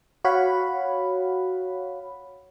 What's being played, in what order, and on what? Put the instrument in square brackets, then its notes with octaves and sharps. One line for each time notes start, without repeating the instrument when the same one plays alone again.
[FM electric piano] F#4 C#5 F5 F#5 B5